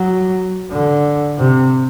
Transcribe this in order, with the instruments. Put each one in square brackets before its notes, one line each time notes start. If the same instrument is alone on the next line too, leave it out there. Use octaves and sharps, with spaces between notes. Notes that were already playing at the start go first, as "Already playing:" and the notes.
Already playing: [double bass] F#3
D3
C3